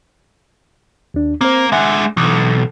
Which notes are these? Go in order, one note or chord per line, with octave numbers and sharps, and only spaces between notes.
D#2 D4
A#3 C4 C5
G#3 D4 E5 F#5 G#5
B1 E3